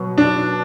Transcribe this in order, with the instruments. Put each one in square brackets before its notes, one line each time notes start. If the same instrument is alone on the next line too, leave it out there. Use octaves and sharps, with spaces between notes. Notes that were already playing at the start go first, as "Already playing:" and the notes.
Already playing: [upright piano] B2 F#3 B3
D4